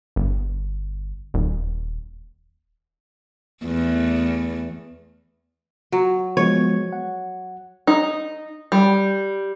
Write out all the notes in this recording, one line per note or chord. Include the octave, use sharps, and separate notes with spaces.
G1
D#1
E2 A3
F#3
F3 G#3 B3 C#5
F#5
D#4
G3